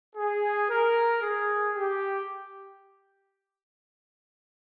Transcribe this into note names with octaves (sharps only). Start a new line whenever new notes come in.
G#4
A#4
G#4
G4